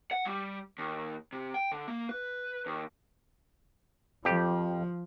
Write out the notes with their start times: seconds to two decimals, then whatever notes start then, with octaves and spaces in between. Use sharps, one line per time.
0.12 F#5
0.25 G3
0.78 D#2
1.33 C3
1.54 G5
1.72 D3
1.87 A#3
2.09 B4
2.66 D#2
4.25 F2 F3 G4